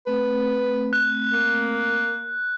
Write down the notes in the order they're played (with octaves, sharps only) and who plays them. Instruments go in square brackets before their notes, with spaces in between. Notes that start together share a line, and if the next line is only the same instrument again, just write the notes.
[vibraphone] A3 C4 [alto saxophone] B4
[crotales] F#6
[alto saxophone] A#3